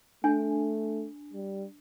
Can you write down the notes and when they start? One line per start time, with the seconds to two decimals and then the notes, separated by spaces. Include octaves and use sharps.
0.24 A3 D4 G#5
1.33 G3